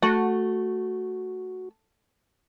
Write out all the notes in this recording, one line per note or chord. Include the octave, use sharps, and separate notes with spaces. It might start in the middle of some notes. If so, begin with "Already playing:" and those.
A3 F#4